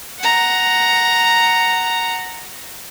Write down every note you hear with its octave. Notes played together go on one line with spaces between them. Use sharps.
F#5 A#5